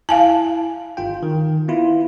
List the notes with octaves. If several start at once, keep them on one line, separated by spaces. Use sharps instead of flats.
E4 F5 G#5 A5
G1 F4 G5
D#3
B3 E4 F4